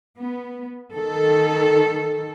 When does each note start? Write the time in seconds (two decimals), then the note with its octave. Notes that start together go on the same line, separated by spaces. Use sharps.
0.18 B3
0.93 D#3 A4